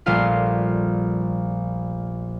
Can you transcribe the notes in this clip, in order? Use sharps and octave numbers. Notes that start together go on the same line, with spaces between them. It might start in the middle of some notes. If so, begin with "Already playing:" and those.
A#1 G3 A3 F4 F5 C7